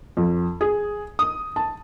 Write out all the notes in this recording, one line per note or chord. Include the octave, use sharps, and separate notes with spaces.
F2
G#4
D#6
A5